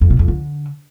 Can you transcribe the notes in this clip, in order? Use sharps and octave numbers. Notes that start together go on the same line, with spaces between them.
F2
B2
F2
D3